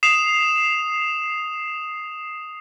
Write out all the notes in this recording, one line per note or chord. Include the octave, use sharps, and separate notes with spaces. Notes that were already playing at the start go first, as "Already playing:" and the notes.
D#6 C7 E7 F7